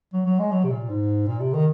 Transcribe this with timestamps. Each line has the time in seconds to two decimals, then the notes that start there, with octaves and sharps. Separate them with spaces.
0.13 F#3
0.26 F#3
0.39 G#3
0.51 F#3
0.64 C3
0.71 A#2
0.90 G#2
1.28 A#2
1.40 C3
1.53 D#3